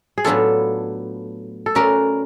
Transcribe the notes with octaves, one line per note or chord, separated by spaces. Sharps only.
G#4
A2 F#3 B3 D4 F4 A4
A4
A3 C#4 F#4 A#4 B4 D5